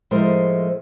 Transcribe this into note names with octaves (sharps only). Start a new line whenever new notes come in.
A2 F3 G#3 A3 A#4 C5